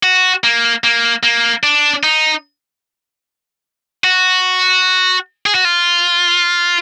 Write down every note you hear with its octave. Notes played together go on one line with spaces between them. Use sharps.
F#4
A#3
A#3
A#3
D4
D#4
F#4
G#4
F#4
F4